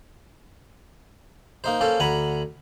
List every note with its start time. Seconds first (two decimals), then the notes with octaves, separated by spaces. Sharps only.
1.64 A#3 D#4 C5
1.81 A#3 C#4 A4 C5
2.00 D2 F#5 G#5 A#5 B5